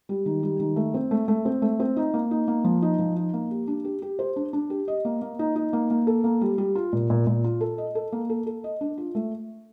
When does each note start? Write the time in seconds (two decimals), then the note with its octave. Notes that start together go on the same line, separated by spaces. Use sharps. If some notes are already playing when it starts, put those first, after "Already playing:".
0.09 G3
0.26 D#3
0.43 G3
0.60 D#3
0.76 A3
0.94 C4
1.11 A3
1.28 A3
1.45 C4
1.62 A3
1.80 C4
1.96 D#4
2.14 A#3
2.31 D#4
2.48 A#3
2.64 F3
2.82 D#4
2.99 F3
3.16 D#4
3.33 A#3
3.51 G4
3.68 D4
3.85 G4
4.02 G4
4.19 C5
4.36 D4
4.53 D4
4.70 G4
4.88 D#5
5.05 A#3
5.22 A#3
5.39 D#4
5.56 D#4
5.73 A#3
5.90 A#3
6.07 A4
6.24 A#3
6.41 G3
6.58 G3
6.75 F4
6.93 A#2
7.10 A#2
7.27 A#2
7.44 F4
7.61 A4
7.78 D#5
7.95 A4
8.12 A#3
8.30 A4
8.46 A4
8.64 D#5
8.81 D4
8.98 F4
9.15 A3